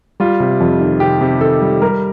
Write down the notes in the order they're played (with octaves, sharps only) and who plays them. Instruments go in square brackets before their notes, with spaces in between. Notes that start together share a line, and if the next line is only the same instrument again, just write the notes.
[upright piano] G3 [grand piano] F4
[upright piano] C3
F2
D#3
[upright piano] C3 [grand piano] G4
[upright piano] C3
[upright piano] D#3 [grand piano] A4
[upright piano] G3
[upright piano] G3 [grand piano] A#4